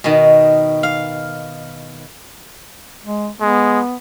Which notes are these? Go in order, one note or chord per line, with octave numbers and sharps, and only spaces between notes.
B2 D#3
F5
G#3
G#3 B3